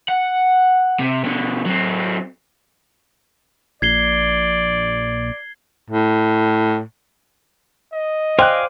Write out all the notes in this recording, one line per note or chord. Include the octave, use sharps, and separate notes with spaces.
F#5
C3
B2 D3
F#3 C4
A#1 D5 G#6 C7 G7
A2
D#5
C5 D5 F5 G5 G#5 F#6